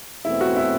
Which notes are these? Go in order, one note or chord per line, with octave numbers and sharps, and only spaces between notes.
E2 B2 F#3 A3 C4 E4
F#4
E4